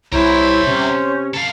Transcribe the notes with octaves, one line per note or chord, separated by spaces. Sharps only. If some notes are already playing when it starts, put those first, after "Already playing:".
C2 E4 A#4 C5 C#5 E5
C3 C#4
A4 F5